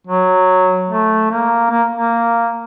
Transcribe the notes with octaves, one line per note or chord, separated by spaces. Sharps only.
F#3
A3
A#3
A#3
A#3